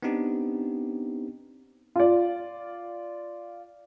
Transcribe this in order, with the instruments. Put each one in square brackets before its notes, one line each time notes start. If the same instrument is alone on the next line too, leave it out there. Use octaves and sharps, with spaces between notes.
[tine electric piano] B3 C4 D4 D#4 G4
[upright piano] F4 D5